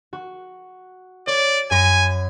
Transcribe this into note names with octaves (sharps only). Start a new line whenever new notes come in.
F#4
C#5 D5
F#2 G#5 B5 A#6